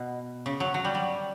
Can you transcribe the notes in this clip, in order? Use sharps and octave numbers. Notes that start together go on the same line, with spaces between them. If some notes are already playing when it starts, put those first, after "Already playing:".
Already playing: B2
C#3
F#3
F#3
G3
G3